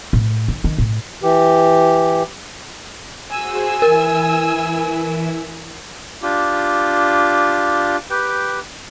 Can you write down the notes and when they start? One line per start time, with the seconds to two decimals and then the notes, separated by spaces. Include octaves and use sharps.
0.13 A2
0.48 D#3
0.64 D#3
0.78 A2
1.23 E3 G4
3.33 F#4 G#4 C5 G#5 E6
3.82 E3 E4 A#4
6.22 D4 F4 G4
8.10 G4 B4 G5